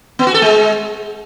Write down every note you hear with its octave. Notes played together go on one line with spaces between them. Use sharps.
B3
F#4
A4
G#3